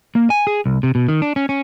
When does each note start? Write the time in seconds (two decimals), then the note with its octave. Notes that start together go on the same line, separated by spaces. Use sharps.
0.15 A#3
0.30 G#5
0.47 G#4
0.66 C2
0.83 C3
0.95 B2
1.08 D#3
1.22 D4
1.36 C#4
1.49 C#4